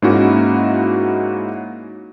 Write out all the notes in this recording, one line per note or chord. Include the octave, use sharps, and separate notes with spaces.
G#2 A#3 C#4 D#4 E4 F#4